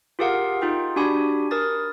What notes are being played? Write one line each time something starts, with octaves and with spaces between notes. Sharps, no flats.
F4 G4 G#4 A#4 F5 F#5
D#4 F4 G#4 G5
D4 F#4 G4 G#5 B5
A#4 D#6 A6